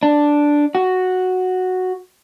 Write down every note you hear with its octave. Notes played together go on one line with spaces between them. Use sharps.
D4
F#4